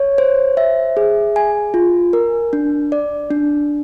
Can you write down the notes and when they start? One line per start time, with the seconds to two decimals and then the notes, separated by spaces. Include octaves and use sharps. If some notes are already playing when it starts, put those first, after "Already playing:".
Already playing: C#5
0.18 C5
0.57 E5
0.97 G#4
1.36 G#5
1.74 F4
2.13 A#4
2.53 D4
2.92 D5
3.31 D4